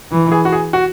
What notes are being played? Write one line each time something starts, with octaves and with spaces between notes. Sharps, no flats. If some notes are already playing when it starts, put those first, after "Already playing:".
E3
G#4
F#4
G#4
F#4